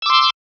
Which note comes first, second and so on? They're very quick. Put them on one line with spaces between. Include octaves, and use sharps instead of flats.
E6 D6 C6